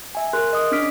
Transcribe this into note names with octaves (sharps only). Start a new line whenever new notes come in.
E5 G#5
G#4 A#4 C6 F#6
D#5 D#6
C#4 D4 D6 F6 B6 D7